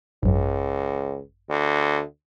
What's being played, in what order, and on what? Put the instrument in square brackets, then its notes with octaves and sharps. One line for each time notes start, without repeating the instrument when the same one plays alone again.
[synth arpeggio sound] G#1 F#2 [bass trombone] C#2
[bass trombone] D2